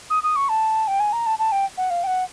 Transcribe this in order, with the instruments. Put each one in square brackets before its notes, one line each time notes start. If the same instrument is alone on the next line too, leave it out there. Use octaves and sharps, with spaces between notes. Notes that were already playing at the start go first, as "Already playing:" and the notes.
[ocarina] D#6
D#6
C#6
A5
G5
G#5
A#5
A5
A5
G5
F#5
F5
G5
F#5